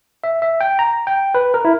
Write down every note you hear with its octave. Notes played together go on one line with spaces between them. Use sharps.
E5
E5
G5
A#5
G5
B4
A#4
E4